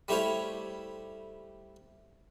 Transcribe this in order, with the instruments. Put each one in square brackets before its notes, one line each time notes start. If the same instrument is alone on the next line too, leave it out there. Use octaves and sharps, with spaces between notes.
[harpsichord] G3 A3 E4 C5 C#5 F5